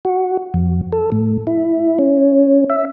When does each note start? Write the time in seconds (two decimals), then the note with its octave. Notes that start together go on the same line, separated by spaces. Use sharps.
0.05 F#4
0.54 F2
0.92 A4
1.12 A2
1.47 E4
1.99 C#4
2.70 E5